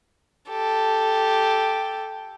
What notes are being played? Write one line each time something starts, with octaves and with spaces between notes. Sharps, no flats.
G4 A4